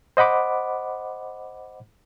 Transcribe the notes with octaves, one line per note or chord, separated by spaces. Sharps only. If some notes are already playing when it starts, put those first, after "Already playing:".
C5 D#5 F#5 B5 D6